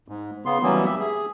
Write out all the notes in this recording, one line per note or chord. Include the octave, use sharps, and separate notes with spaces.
G#2
C#3 B3 C6
E3 F#3 G3 A#3 B3 C#4
G4 E5
G#4